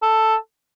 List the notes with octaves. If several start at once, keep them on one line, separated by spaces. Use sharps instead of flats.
A4